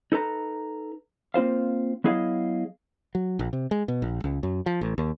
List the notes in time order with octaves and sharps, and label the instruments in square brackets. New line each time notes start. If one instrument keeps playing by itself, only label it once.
[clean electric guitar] D#4 A4 B4 A#5
A#3 C4 F4 C5 F5
F#3 B3 E4 G#4 D#5 F5
[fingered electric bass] F#3
A#1
C3
G#3
B2
A#1
C#2
F#2
F3
A1
D#2